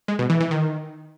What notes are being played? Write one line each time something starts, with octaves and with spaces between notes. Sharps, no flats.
G#3
B2
E3
E3
D#3